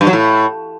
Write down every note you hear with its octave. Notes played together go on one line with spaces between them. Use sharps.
G2
F#3
A2